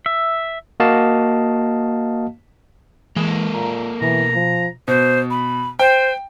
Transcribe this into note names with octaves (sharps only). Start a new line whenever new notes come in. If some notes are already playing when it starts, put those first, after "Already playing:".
E5
A#3 F#4 D#5 F5 A5
E3 G#3 A#3 A4
A#2 A#5
B2 E3 A#5
F3
B2 C5
B5
C5 G5